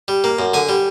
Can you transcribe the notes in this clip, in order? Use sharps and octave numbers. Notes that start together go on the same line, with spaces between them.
G3
A#3
F#2
D3 G#5
G3